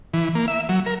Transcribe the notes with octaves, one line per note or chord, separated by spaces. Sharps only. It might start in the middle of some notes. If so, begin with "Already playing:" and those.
E3
A#3
E5
F#3
A#4